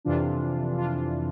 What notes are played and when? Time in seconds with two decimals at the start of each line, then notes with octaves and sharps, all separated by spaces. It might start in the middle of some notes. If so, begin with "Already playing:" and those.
0.05 F2 C3 E3 D4 F4
0.78 D4 F4